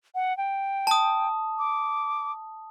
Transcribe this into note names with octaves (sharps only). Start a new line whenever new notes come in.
F#5
G5
A5 D#6
D6